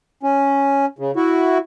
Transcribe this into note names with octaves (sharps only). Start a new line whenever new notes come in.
C#4
C#3
E4 F#4